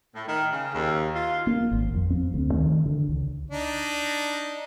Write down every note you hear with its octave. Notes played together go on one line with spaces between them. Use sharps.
A2
D#3
C#3
D#2
F4
A#3
G#1
F2
C4
D2
D#3
D3
C#2
D4 D#4